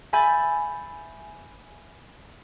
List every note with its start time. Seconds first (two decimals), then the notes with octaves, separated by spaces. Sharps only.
0.13 E5 G#5 B5 G6 A6